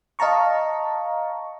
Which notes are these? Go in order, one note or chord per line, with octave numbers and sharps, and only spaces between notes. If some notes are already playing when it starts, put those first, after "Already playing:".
D#5 F5 A5 A#5 C#6